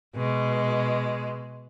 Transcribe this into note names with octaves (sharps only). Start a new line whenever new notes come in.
B2 G#3